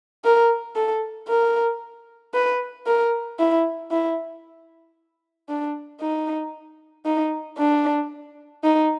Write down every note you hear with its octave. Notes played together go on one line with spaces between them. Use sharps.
A#4
A4
A#4
B4
A#4
E4
E4
D4
D#4
D#4
D4
D#4